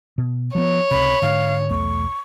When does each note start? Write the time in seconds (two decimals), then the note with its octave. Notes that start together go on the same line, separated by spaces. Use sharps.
0.18 B2
0.55 F3 G#3 B3 C#5
0.91 C#2 C3 B5
1.22 G#2 D3 F5
1.70 B1 E2 A3 C#6